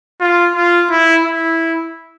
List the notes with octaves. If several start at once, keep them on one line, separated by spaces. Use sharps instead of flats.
F4
F4
E4
E4